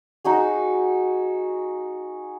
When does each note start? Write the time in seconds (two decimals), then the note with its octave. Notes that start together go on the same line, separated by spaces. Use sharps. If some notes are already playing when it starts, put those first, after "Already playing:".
0.25 D#4 F#4 G#4